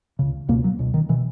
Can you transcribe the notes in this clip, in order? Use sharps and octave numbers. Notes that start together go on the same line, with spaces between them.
C#2 C#3
C#2 B2 A#3
F#3
C#2 B2
D#3
B2 E3